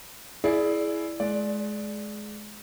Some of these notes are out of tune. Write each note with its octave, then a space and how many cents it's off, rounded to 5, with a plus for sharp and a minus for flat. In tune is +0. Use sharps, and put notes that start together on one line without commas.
E4 +0 G#4 +20 D5 +5
G#3 +25 D5 +0